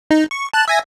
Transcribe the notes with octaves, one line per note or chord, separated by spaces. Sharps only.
D#4
C#6
A5 F#6
E5 G#5 A#6